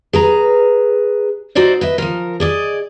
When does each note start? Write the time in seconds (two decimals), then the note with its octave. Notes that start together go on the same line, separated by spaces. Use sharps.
0.13 G#4 B4 A#5
1.55 D#4 F#4 C5 D5 E5
1.81 B4 D#5 E5
1.98 F3 A#4
2.40 G#4 D5 D#5